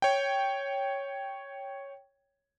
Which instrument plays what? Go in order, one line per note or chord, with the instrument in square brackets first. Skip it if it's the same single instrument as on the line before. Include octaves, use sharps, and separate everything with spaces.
[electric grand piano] C#5 G5